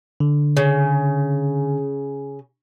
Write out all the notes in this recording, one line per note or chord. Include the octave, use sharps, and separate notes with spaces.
D3
C#3